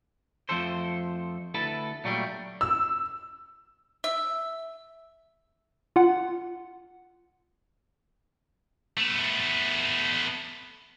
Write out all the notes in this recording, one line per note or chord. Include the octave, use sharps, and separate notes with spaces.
F2 F3 A3 A4 C5
D2 E4 A4 B4 A5
A#2 F#3 G3 A3 D4
E6
E5
F4 F#5
A3 B3